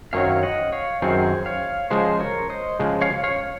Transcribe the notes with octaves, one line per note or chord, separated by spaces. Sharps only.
F#2 D#3 F#3 C4 C#5 F5
D#5 F#5
C#5 F5
F#2 D#3 F#3 C4 G#4 C5
C#5 F5
C#3 F3 G#3 G#4 C5
A#4 C#5
C5 D#5
C#3 F3 G#3
C#5 F5
C#5 F5